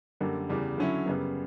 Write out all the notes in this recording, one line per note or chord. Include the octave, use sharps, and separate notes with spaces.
F#2 D3 G3 A#3
E2 C#3 G3
D3 F#3 C#4 E4
F#2 C#3 G3 B3